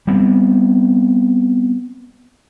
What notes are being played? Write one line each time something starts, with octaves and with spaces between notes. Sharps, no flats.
G3 B3 C4